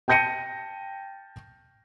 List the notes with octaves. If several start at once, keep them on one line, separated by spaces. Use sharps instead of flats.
G5 A5 G6 A#6 C#7 D#7